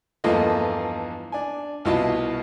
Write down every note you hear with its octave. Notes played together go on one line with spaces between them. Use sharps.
E2 G2 F3 A#3 A4 D#5
D4 G#5
C2 B2 E4 F4 D#5 A5